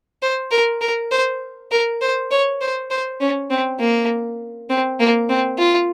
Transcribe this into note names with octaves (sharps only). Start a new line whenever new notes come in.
C5
A#4
A#4
C5
A#4
C5
C#5
C5
C5
C#4
C4
A#3
C4
A#3
C4
F4